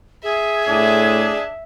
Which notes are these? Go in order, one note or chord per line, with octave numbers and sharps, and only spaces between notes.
G#4 E5
A2 D4